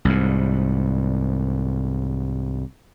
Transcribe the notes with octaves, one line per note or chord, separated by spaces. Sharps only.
C2 G#2